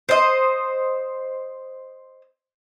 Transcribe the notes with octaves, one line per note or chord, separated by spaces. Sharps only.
C5 D#5